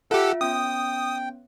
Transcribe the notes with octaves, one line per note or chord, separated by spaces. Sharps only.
F4 G4 A4 E5 F#5 E6
B3 C#4 G5 D#6